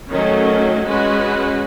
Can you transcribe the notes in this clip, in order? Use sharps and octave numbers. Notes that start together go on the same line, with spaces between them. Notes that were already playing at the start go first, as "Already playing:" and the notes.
D#3 F#3 A3 C#4
G#3 C#4 F#4 B4